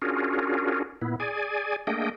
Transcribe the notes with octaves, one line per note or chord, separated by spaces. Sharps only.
C#4 D4 F4 F#4 G#4 A#4
A#2 B3 E4
G#4 D5 G#5
A3 A#3 D4 G#4 D#5 G5